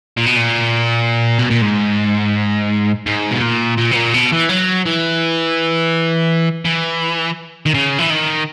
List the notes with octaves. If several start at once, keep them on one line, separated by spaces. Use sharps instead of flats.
A#2
B2
A#2
B2
A#2
G#2
G#2
B2
A#2
A#2
B2
A#2
B2
E3
F#3
E3
E3
D#3
C#3
E3
D#3